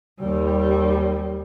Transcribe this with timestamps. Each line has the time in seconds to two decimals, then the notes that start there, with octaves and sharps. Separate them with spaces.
0.19 D#2 G3